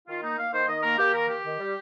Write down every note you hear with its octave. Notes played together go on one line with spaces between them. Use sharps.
D#3 F4
A#3 D#4
A#3 F5
D#3 C5
D#3 D#5
A#3 A#4
A#3 G4
D#3 A#4
D#3 G4
D#3
G3